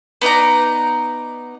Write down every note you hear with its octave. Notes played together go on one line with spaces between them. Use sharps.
B3 D#4 D5 A#5